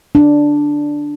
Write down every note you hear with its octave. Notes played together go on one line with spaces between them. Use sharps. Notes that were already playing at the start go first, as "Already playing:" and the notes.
D4